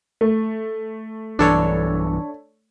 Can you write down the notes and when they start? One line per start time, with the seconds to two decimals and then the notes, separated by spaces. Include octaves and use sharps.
0.21 A3
1.39 B1 G2 E3 D4 A4 C#5